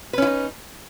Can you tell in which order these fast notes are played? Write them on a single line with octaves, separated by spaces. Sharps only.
B4 C#4 E4 D#4